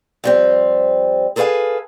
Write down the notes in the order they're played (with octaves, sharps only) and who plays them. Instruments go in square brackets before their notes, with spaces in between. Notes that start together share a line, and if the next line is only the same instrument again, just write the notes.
[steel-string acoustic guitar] F2 G3 C4
G#4 A4 B4 C#5 F5 G#5